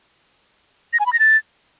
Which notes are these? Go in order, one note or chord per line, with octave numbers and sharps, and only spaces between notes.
A#6
G#5
B5
A#6
A6